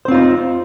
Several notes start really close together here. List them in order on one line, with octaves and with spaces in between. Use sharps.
C5 C4 F4 D#4